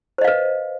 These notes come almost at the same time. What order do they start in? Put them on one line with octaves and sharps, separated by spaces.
C5 D#5 F5 B4